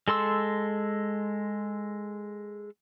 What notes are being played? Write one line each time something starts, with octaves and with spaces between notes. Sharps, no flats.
G#3 A4 C6 E6